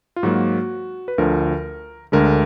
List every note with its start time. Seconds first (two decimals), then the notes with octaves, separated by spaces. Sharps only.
0.16 F4
0.23 G#2 F#3 A#3 F#4
1.08 B4
1.18 D2 D3 F3 A#4
2.12 D2 D3 G#3 A#4